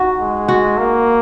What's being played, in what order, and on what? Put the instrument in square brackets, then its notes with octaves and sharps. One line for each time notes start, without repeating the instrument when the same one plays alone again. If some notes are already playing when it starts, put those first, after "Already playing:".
Already playing: [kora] D#4 F#4
[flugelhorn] G#3
[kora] F#4
[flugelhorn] A#3